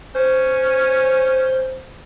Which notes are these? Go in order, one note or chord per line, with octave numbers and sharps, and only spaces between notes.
C#4 C5